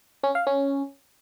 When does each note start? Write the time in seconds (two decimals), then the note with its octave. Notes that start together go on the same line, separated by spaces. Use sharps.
0.23 C#4
0.35 F5
0.47 C#4